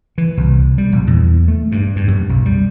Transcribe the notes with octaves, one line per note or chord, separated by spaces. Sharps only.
E3
C2
G3
A#1
E2
A3
G2
G2
F#2
B1
G3